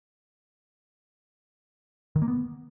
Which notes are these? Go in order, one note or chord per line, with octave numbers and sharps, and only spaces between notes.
D#3
A#3
B3